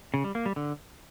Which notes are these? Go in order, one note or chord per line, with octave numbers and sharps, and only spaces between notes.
C#3
G3
A#3
G3
D3